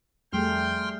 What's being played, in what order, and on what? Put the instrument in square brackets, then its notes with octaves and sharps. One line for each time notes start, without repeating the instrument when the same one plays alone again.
[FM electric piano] F2 [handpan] G3 A3 G#4 [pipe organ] G5 C6 F6